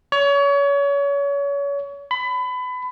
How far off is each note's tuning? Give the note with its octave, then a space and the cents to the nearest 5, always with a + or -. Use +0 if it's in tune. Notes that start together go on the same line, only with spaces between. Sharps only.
C#5 +30
B5 +25